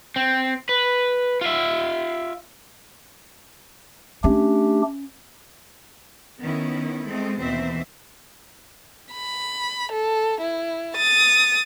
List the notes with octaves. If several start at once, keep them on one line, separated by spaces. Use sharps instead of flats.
C4
B4
F4 E5
A3 C#4 D4 G4
D#3 B3 C#4 E4
G#3 A3 C4
D#2 B2 E3 C4 C5 E5
B5
A4
E4
D#6 A6